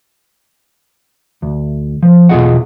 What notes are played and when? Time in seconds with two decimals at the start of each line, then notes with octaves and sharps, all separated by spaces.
1.42 D2
2.03 F3
2.29 B1 E2 F4 G#4 D#5 F#5